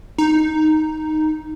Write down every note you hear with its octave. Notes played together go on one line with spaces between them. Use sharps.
D#4